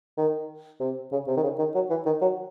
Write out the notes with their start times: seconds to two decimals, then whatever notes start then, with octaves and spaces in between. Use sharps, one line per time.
0.17 D#3
0.80 C3
1.12 C#3
1.27 C3
1.37 D#3
1.43 C#3
1.59 D#3
1.75 F#3
1.90 E3
2.06 D#3
2.22 F#3